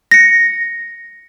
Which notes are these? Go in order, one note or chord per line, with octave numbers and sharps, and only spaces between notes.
A#6 C#7